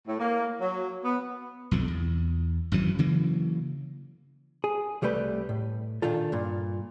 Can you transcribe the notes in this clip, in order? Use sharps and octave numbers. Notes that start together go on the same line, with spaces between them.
A2
A#3
F#3
B3
B1 F2 D3
E2
G#1 F#2 E3 F#3
C#3 E3 F#3 A#3
G#4
C2 G3 A3 G4 B4
A2
A#2 D#3 D4 F4 A4
G2 A#2